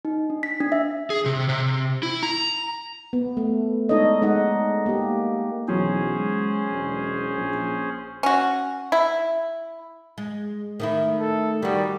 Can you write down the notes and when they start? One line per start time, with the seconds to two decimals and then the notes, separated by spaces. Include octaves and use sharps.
0.05 D#4
0.30 D4
0.43 B6
0.60 D4
0.72 E5
1.10 G#4
1.26 C3
1.49 C3
2.03 E4
2.23 A#5
3.13 B3
3.37 A3
3.89 G#3 D4 D#4 A4 C#5 D#5
4.22 G#3 D#4 D#5 F#5
4.86 A#3 G4
5.68 B1 E3 F#3 B3 C#4 G#4 C5
6.18 G#3
6.72 E1
7.37 A#1
8.23 C#4 F#4
8.92 E4
10.18 G#3
10.80 D#3 A3 E4
11.20 A4
11.62 D#3 G3 F#4